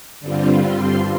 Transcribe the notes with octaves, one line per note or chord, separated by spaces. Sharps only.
G2 D3 G3 C4 F4
C6